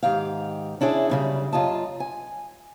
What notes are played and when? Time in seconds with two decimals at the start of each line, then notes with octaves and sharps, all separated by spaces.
0.03 G#2 D#3 G4 F5
0.81 C#4 D4 E4 G#4
1.10 F#2 C#3 G3
1.53 F#2 F4 D#5 A5
2.00 G#5